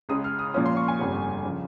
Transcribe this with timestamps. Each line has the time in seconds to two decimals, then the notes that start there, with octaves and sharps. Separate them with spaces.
0.09 C#2 C#3 G#3 D#6
0.24 F6
0.39 D#6
0.54 A#2 F3 A#3 C#4 F4 D#6
0.66 C6
0.77 C#6
0.88 G#5
0.98 G1 F2 C#3 G3
1.45 C#3 F3